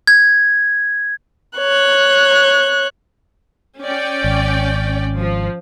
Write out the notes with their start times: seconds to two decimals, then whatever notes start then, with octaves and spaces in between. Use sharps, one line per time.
0.07 G#6
1.58 C#5 F#6
3.83 C#4 D5 G5
4.24 G#1
5.18 F3